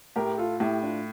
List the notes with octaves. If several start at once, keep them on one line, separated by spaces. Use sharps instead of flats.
A2 G4 A#4
F4 A4
A2 E4 G4
D4 F4